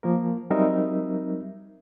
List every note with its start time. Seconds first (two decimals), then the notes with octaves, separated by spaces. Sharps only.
0.03 F3 A#3 A#4
0.50 F#3 G3 C4 D#4 A#4 E5